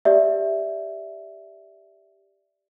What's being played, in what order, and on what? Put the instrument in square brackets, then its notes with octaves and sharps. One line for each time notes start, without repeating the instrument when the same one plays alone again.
[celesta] G4 D5 E5